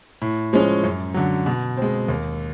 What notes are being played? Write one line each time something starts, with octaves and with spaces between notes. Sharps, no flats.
A2
F3 G#3 C#4
F#2
D3 F#3
B2
G#3 C4
D#2